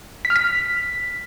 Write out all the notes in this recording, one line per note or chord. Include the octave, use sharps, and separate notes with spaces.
B6
F6
B6